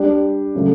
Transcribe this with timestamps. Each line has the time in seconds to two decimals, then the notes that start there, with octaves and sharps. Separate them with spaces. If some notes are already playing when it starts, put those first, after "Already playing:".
Already playing: G3 D4 G4
0.55 C#3 F#3 A3